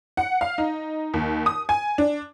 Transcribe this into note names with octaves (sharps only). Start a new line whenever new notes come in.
F#5
F5
D#4
D#2
D#6
G#5
D4